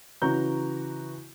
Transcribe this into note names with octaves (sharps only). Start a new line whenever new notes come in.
C#3 E3 F#4 A#5 C#6 G6